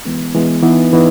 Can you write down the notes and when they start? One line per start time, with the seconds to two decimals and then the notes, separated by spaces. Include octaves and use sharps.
0.05 E3 G#3 B3
0.35 E3 G#3 B3
0.63 E3 B3 D#4
0.93 E3 B3 D#4